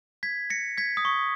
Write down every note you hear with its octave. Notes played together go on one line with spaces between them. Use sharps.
G#6 B6
A#6 C#7
G#6 B6
D#6
C#6